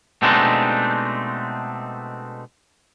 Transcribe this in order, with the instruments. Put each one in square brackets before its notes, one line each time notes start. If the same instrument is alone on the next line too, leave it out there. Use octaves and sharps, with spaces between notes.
[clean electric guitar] B2 G#3 A3 C4 D4 D#4